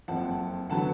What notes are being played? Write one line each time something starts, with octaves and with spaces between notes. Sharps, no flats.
F#1 F2 F3 F#5 A5
D3 F#3 B3 F#5 A5